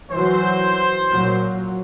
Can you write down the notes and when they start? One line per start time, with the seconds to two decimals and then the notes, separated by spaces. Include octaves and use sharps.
0.11 E3 F#3 C5
1.11 A#2 F#3